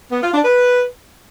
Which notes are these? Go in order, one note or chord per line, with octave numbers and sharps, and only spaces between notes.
B3
F4
D4
B4